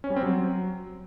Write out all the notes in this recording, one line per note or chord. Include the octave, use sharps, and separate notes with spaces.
C#4
G3
C4
F#3